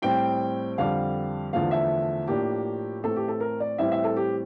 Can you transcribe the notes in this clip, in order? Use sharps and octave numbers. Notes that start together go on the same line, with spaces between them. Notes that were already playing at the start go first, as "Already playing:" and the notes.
A2 G3 C4 G5
F2 D3 G3 F5
E2 D3 F3 A3 F5
E5
A2 F3 A#3 D4 G4
A2 E3 A3 C4 A4
G4
A4
A#4
D5
A2 E3 G3 C4 E5
E5
A4
G4